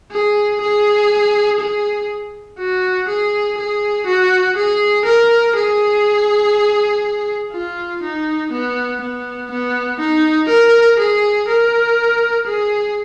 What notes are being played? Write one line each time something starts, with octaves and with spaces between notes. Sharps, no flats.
G#4
G#4
G#4
F#4
G#4
G#4
F#4
G#4
A#4
G#4
F4
D#4
B3
B3
B3
D#4
A#4
G#4
A#4
G#4